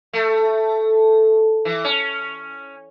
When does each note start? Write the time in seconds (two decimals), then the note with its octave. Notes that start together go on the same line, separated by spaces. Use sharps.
0.13 A3
1.65 E3
1.84 C#4